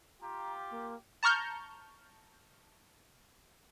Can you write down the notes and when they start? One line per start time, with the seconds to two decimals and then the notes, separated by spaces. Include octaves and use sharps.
0.22 F4 G4 A#5
0.71 A#3
1.23 A5 A#5 C#6 F6 G6